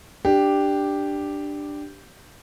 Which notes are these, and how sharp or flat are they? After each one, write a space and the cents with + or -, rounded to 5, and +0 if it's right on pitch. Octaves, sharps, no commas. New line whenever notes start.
D4 +5 G4 +0